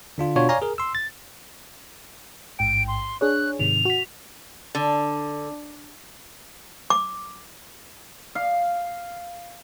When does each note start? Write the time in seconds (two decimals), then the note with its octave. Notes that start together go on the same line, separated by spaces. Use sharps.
0.18 D3 D4 F4
0.36 B2 D4 F4 F#4 C#5
0.49 C#5 D5 F5 G#5 A#5
0.62 G#4 A#4
0.78 C6 E6
0.95 A6
2.59 A1 G#2 G5 D7
2.88 C6
3.21 D4 G#4 C#5 F#6
3.59 G#2 C3 D#3 F7
3.85 F#4 B6
4.75 D3
6.90 D6
8.35 F5